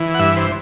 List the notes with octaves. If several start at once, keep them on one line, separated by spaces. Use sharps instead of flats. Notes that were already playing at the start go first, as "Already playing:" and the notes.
Already playing: E3
F#5
G2 E5
C5